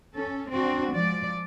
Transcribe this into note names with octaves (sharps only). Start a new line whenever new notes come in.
C#4 A4
C4 D4 F#4
F3 G#3 D5